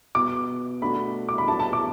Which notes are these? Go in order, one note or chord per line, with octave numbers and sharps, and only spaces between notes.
B2 B3 F#4 D6
B2 A3 D4 F#4 B5
D6
B5
A2 F#3 B3 D4 A5
A5
D6